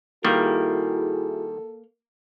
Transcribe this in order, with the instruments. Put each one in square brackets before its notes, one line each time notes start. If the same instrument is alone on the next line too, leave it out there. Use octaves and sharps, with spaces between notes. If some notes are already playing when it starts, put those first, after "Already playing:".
[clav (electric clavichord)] D#3 G3 [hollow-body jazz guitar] A#3 [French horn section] E4 F#4 G#4 [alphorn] A4